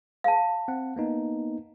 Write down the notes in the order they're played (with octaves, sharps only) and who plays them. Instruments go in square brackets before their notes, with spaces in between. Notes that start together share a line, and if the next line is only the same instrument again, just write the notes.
[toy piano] F5 A5
[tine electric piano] C4 F#5
A#3 B3 D#4